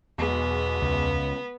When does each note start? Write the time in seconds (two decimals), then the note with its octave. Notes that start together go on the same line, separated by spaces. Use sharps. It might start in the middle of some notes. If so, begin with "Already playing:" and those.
0.18 B1 E2 B2 G#3 B3
0.82 C#2